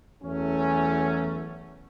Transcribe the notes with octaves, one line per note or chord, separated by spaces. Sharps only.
E2 F#3 A3 C#4